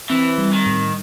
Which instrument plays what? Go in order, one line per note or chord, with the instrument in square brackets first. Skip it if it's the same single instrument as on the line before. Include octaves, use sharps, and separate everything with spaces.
[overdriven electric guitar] E3 [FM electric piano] C4
[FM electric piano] G3
[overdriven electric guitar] D#3
[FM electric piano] A2